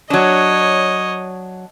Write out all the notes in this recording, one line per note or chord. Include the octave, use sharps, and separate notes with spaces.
F#3 D4 C#5 D#5